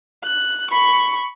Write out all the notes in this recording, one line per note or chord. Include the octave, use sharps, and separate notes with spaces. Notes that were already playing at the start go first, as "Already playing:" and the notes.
F#6
B5 C#6